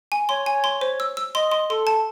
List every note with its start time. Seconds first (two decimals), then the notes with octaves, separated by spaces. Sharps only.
0.12 G#5
0.29 C#5 C6
0.46 G#5
0.64 C6
0.81 C5
1.00 E6
1.17 E6
1.34 D#5 C6
1.52 C6
1.70 A4 C6
1.87 A5